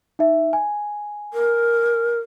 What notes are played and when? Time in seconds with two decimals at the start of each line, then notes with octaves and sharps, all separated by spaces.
0.19 D#4 E5
0.53 G#5
1.33 A#4